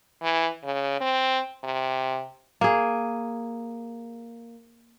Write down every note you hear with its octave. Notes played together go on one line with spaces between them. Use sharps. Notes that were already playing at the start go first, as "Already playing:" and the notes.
E3
C#3
C4
C3
A#3 G#4